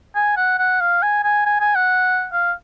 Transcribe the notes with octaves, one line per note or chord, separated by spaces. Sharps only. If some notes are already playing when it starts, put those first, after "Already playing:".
G#5
F#5
F#5
F5
G#5
G#5
G#5
G#5
F#5
F5